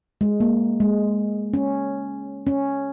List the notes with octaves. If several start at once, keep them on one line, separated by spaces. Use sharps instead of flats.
G#3
A#3
G#3
C#4
C#4